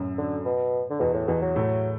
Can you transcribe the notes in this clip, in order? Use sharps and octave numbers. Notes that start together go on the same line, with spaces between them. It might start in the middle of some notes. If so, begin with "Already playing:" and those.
Already playing: F#2 A2 F#3 A3
D3
B2
D3
E2 B2 E3
A2
E2 B2 E3
F#3
A2 A3